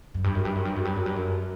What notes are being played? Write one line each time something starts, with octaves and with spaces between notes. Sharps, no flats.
F#2
G2
F#2
G2
F#2
G2
F#2
G2
F#2
G2
F#2